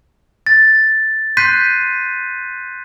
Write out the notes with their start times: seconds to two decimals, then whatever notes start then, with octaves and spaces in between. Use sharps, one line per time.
0.47 A6
1.37 C6 F#6 G6 B6 C7 D#7